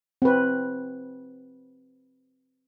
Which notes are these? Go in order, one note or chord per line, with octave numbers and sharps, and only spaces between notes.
C4 B4